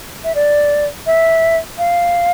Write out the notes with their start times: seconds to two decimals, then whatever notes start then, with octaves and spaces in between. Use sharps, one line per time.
0.24 E5
0.35 D5
1.06 E5
1.78 F5